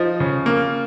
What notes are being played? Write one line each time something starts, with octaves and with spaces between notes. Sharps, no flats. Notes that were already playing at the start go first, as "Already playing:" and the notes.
Already playing: F3 D#4
C#3
A#3